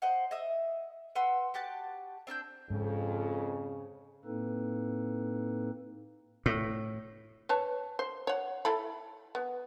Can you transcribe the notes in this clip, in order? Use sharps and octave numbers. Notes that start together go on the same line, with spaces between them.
C5 D#5 F#5
D#5 E5 D#6
B4 F#5 C6 E6
F#4 G4 A5 F#6
C4 D4 E6 G6
F2 G#2 C#3
A2 A#3 C4 D#4 A4 B4
A2
B4 C#5 A5
C5
C#5 F#5
E4 A4 B5
B3